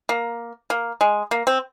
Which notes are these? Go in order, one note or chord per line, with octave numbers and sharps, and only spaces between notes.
A#3
A#3
G#3
A#3
C4